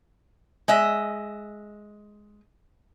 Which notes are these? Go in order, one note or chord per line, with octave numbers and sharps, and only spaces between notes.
G#3 D#5 E5